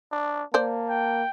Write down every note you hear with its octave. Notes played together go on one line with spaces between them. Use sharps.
D4
A#3 C5 D5 A5
G5